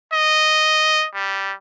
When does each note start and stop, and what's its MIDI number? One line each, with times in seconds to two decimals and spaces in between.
0.13 1.06 75
1.14 1.54 55